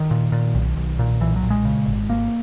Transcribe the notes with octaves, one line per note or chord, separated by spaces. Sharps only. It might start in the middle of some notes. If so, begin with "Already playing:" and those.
Already playing: D#3
A#2
A#2
B1
B1
A#2
B1 E3
F#3
A#2
G#3
C#3
G#1
G#1 A#3